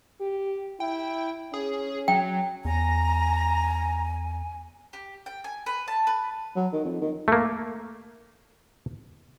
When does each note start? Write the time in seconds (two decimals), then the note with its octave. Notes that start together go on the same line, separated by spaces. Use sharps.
0.20 G4
0.80 E4 G5
1.54 C#4 G#4
2.08 F#3 G5
2.65 E2 G#5 A#5
4.93 G4
5.26 G5
5.44 G#5
5.66 B4
5.88 A5
6.07 B4
6.56 F#3
6.73 D#3
6.85 F2
7.01 D#3
7.28 A3 A#3